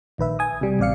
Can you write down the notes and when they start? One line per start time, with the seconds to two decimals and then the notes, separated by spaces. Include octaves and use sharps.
0.18 A#1 D#3 B4 E5
0.39 G#5 D#6
0.61 C3 G3
0.79 A1 C3 D5 F5 C#7